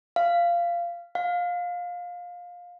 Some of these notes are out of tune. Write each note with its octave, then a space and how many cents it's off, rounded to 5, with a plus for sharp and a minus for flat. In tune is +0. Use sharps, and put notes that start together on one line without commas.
F5 -15
F5 +20